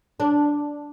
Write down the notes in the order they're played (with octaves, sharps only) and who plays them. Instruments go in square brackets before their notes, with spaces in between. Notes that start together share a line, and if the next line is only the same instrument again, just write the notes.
[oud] D4